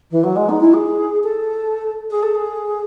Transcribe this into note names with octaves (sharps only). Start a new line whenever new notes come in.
E3
F#3
G#3
D#4
E4
G#4
A4
G#4
A4
G#4